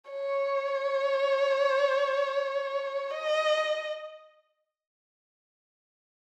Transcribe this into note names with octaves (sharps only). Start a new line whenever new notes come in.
C#5
D#5